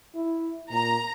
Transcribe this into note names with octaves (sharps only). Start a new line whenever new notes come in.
E4
A#2 A#5